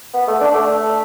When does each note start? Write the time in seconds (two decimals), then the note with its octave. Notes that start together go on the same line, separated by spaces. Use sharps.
0.14 B3
0.28 A3
0.41 D4
0.55 A3